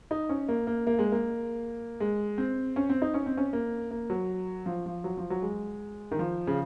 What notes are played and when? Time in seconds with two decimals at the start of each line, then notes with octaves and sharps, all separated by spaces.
0.11 D#4
0.29 C#4
0.48 A#3
0.67 A#3
0.87 A#3
0.99 G#3
1.12 A#3
2.00 G#3
2.38 C4
2.76 C#4
2.90 C4
3.02 D#4
3.14 C#4
3.26 C4
3.37 C#4
3.53 A#3
3.91 A#3
4.10 F#3
4.66 F3
4.86 F3
5.04 F#3
5.17 F3
5.30 F#3
5.42 G#3
6.11 D#3
6.19 F3
6.47 C#3